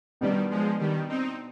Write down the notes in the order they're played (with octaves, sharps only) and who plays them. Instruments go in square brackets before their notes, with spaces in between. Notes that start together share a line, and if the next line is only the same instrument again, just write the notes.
[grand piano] B2 B3 D4 [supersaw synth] D#3 G3
[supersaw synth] F3 G#3
D#3 G3
C4 D#4